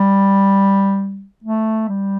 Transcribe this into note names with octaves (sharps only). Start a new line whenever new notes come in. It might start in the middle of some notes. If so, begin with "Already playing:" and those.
Already playing: G3
A3
G3